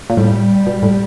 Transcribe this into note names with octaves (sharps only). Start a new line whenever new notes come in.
A#2
A2 G3
B2
A2